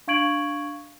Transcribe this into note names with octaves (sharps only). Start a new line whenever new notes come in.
D4 F5 C#6 G#6 D7 F#7